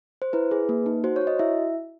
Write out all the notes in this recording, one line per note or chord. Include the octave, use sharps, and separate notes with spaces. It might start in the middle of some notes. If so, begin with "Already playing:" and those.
C5
E4 B4
G#4
A#3
D#4
F#4 C5
C#5
F#4
D#5
E4 E5